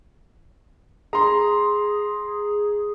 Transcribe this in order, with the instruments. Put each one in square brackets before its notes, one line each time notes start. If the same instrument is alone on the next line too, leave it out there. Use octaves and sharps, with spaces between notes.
[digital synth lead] G#4 [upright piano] A#5 C6